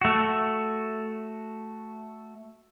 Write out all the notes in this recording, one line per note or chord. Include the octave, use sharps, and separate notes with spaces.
A3 F#4